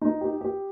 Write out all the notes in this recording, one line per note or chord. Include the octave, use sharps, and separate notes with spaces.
D#4
G4
G4